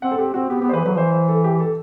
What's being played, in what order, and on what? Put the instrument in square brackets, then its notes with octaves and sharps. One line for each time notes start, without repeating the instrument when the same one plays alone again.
[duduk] C4 [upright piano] F#5
[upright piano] A4
[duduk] C4 [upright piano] G4
[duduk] C4 [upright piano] F#4
[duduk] B3 [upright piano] G4
[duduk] B3 [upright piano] G4
[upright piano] C5
[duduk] E3 [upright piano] B4
[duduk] F#3 [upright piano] B4
[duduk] E3 [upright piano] C5
[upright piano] C5
A4
G4
A4